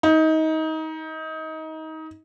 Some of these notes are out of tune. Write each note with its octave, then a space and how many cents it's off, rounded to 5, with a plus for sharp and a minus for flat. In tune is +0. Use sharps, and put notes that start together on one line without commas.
D#4 +25